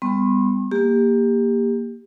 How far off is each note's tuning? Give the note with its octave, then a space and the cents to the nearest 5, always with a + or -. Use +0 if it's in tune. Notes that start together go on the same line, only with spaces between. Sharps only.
G3 +30 B3 +30 C#6 -45
A#3 +0 G4 +25